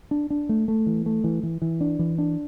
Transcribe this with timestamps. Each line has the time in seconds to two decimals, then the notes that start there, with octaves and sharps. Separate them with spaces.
0.11 D4
0.30 D4
0.49 A3
0.68 A3
0.87 E3
1.06 A3
1.24 E3
1.43 E3
1.62 E3
1.81 D4
1.99 E3
2.18 D4